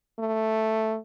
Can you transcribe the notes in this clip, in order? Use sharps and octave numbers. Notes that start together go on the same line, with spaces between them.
A3